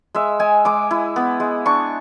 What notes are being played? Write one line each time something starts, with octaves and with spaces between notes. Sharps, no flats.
G#3 E5
G#3 G#5
G#3 D6
E4
B3
G#3
D4 C#6